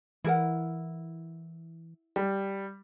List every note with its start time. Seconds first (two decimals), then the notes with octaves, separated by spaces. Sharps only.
0.25 E3 E4 A#4 F#5
2.16 G3